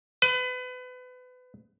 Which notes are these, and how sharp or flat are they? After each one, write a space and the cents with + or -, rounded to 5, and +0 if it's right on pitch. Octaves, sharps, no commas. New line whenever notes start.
B4 +30